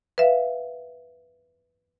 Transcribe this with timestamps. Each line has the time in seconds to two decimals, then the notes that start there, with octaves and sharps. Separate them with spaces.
0.18 B4 E5 F5